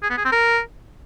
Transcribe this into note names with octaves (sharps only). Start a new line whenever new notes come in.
G#4
B3
G#4
C4
A#4